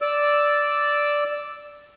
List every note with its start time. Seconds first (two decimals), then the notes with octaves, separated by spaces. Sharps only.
0.02 D5 E6